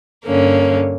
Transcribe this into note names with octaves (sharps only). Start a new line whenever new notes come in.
G2 D3 A#3 C#4